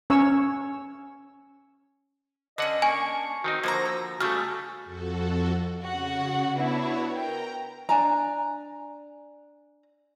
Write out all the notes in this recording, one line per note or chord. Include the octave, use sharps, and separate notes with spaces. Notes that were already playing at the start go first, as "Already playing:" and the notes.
C#4 C#5 E6
D3 C#4 D4 D#5 F#5
A#3 G#5 C#6
D#3 C4 D#4 F#4
D3 F3 A#3 C4 C5 A#5
E6
C#3 G3 A3 F#4 G#4 A4 F6
F2 F#4 A4
C#3 F#4 F#5
B3 D4 E4 F#4 C#5
A#4 G5 A#5
D4 G#5 A#5